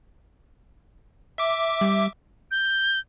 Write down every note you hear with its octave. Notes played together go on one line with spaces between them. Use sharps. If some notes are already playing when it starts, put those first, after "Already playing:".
E5 D6
G3
G6